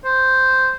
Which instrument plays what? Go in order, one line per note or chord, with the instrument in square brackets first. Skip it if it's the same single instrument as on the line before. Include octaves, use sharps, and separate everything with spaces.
[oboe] C5